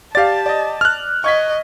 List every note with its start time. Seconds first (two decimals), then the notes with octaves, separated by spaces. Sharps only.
0.15 G4 D5 F5 A5 A6
0.46 D5 D#5
0.81 F6 F#6
1.24 D#5 C#6 G#6 B6